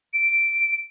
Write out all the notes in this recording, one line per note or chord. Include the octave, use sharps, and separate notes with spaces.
D7